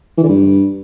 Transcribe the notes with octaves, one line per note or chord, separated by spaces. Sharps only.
E3
D3
G2